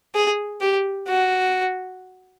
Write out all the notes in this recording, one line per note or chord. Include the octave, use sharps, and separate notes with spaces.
G#4
G4
F#4